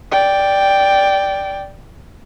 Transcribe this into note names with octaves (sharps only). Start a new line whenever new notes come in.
D5 G5